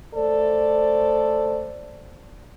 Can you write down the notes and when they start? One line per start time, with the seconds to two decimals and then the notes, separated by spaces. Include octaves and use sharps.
0.15 A3 A4 C5 D5